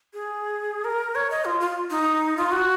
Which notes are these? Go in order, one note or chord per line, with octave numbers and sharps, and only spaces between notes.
G#4
A#4
C#5
D#5
F4
F4
D#4
F4
F#4